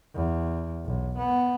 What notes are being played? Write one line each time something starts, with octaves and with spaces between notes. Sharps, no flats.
E2
B1
B3